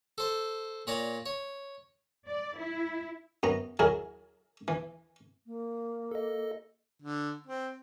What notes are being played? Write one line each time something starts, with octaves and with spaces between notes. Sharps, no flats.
A4 C5
A#2 C#5 D5 A#5 D6
C#5
D5
E4
F#2 B3 A#5
F#3 E4 G#4 A#4
E3
A#3
A4 D#5
D3
C4